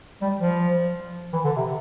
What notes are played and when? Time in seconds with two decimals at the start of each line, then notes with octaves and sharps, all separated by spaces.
0.22 G3
0.41 F3
1.33 E3
1.44 D3
1.56 C3